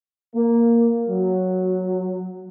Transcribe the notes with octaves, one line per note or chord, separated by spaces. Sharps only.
A#3
F#3